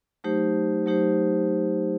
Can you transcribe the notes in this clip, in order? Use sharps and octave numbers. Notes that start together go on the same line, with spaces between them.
F#3 A3 D#4 G4 C5
F#3 A3 D#4 G4 C5